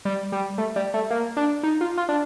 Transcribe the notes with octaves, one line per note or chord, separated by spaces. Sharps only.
G3
G3
A3
G3
A3
A#3
D4
D#4
F4
F4
D4